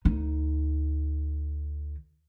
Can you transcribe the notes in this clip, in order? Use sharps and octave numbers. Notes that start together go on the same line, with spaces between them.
D2 D#4